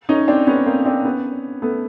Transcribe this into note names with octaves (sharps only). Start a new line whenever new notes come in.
C#4 D#4
C4 D4
B3 C#4
A#3 C4
C4 D4
B3 C#4
A3 B3